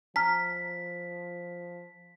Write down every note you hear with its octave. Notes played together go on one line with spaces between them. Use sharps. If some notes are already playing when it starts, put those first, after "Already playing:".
F3 A5 A#5 F6 B6